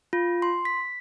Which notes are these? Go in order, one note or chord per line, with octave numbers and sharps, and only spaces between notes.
F4
C6
B6